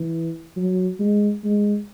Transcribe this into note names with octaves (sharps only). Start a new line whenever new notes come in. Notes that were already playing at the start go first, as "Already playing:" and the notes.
Already playing: E3
F#3
G#3
G#3